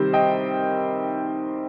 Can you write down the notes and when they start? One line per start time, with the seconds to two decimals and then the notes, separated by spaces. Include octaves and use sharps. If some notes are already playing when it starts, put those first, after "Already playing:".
Already playing: C3 D#3 G3 C4 C5
0.13 D#5 G5